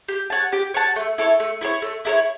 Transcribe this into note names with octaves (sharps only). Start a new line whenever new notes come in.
G4
C#5 F#5 A5
G4
C#5 F#5 A5
A3
E4 A4 C#5
A3
E4 A4 C#5
A3
E4 A4 C#5